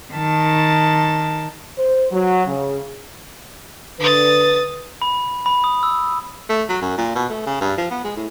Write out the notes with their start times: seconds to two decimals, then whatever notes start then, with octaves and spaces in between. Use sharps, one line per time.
0.13 D#3 A5
1.78 C5
2.12 F#3
2.46 C#3
4.00 D3 B4 D#6 A6
5.02 B5
5.46 B5
5.64 D#6
5.83 E6
6.49 A3
6.69 F#3
6.81 F#2
6.97 A#2
7.15 B2
7.29 A3
7.46 C#3
7.61 G2
7.78 F3
7.91 B3
8.04 G#3
8.16 A2